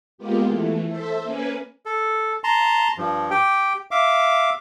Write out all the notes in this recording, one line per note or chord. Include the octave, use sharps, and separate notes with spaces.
G#3 A#3 B3 F4 G4
E3 A3
A4 C5 E5
A#3 C#4 B4 G#5
A4
A5 A#5 C6
G2 F3
G4 G5
E5 F5 D6